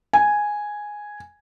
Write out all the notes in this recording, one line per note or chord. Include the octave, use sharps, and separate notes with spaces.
G#5